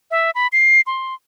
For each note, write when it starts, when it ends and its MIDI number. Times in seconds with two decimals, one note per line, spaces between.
0.11 0.31 76
0.35 0.47 83
0.53 0.81 96
0.87 1.14 84